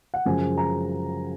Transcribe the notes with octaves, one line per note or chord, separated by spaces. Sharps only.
F#5
F#2 C#3 F3 G#3 G#5
A#5